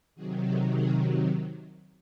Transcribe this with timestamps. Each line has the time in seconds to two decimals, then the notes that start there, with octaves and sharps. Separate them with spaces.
0.15 C3 D#3 F#3 F#4 G#4
0.43 G4 A4
0.71 G#4 A#4